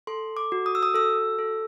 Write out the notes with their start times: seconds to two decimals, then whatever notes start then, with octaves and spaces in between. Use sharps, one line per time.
0.07 A4 C6
0.37 D6
0.52 F#4
0.66 D#6
0.75 E6
0.83 D#6
0.94 A4 E6
1.39 A4